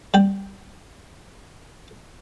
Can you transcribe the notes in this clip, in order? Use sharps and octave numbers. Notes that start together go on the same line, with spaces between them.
G3 G5